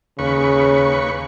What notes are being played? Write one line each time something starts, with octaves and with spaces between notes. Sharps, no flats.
D#2 C#3 B4 C#6